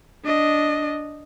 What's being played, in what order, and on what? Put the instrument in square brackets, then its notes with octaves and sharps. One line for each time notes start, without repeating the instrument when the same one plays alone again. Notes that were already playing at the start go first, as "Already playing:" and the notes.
[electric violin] D4 D#5